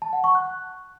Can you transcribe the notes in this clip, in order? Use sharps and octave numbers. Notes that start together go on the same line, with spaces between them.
A5
F#5
C#6
F#6